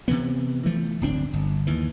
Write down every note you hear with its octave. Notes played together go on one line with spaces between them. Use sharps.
C3 D#3 E3 B3
E3 F3 A3
D1 G1 C4 D4
G1
D#2 E3